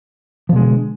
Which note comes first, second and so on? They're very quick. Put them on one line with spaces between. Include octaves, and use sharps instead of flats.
F3 B2 G#3 D3